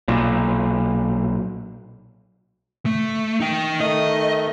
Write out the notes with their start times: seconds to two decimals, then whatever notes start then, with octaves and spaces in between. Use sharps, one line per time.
0.08 B1 A#2
2.86 A3
3.40 D#4 G5
3.81 D#3 A3 D#5